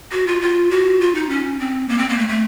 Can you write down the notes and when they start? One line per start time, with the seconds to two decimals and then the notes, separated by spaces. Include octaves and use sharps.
0.12 F#4
0.27 F4
0.42 F4
0.71 F#4
1.01 F4
1.15 D#4
1.29 C#4
1.59 C4
1.89 A#3
1.98 C4
2.09 A#3
2.18 A3
2.29 A3